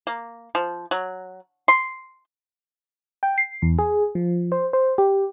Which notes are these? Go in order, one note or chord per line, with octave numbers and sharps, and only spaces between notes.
A#3
F3
F#3
C6
G5
C7
E2
G#4
F3
C5
C5
G4